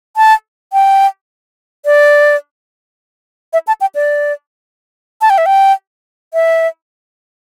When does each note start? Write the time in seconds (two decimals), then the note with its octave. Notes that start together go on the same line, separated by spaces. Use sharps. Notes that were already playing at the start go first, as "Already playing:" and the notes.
0.17 A5
0.73 G5
1.85 D5
3.53 E5
3.67 A5
3.81 G5
3.95 D5
5.21 A5
5.30 G5
5.38 E5
5.46 G5
6.34 E5